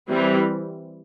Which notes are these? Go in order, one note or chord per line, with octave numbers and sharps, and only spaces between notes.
E3 G3 C4